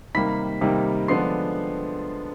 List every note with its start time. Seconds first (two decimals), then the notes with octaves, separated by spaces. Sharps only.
0.15 C3 D#3 G3 A#3 B5 B6
0.61 C3 D#3 G3 A#3
1.08 D3 F3 G#3 B3 D4 C6 C7